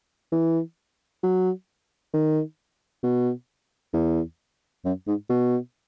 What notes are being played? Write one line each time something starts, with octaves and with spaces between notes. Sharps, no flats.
E3
F#3
D#3
B2
E2
F#2
G#2
B2